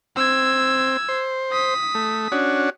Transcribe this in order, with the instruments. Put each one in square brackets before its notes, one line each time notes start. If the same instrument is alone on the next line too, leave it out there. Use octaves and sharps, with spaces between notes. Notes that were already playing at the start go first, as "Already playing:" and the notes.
[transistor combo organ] C4 [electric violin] E6 G#6
[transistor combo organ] C5
[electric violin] D#6 B6
[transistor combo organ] A3
C#4 D4 F#4